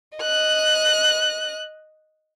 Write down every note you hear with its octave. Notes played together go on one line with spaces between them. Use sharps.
D#5 F#6